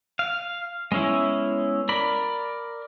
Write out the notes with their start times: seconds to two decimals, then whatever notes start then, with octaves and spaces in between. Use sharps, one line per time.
0.19 F5
0.92 G#3 B3 C#4 E4
1.89 A#4 D5 B5